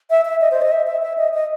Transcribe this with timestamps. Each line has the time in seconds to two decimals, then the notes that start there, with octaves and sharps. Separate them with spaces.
0.10 E5
0.25 E5
0.41 D#5
0.51 C5
0.62 D#5
0.72 E5
0.87 E5
1.03 E5
1.18 D#5
1.34 D#5